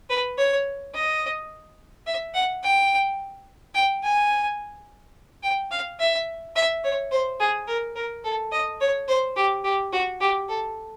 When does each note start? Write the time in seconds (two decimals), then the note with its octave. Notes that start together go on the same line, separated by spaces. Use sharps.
0.09 B4
0.38 C#5
0.94 D#5
2.06 E5
2.34 F#5
2.62 G5
3.74 G5
4.03 G#5
5.43 G5
5.71 F5
5.99 E5
6.56 E5
6.84 C#5
7.11 C5
7.40 G#4
7.67 A#4
7.96 A#4
8.24 A4
8.52 D#5
8.81 C#5
9.08 C5
9.36 G4
9.64 G4
9.93 F#4
10.21 G4
10.49 A4